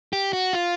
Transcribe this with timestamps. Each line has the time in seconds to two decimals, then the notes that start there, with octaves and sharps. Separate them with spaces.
0.13 G4
0.33 F#4
0.53 F4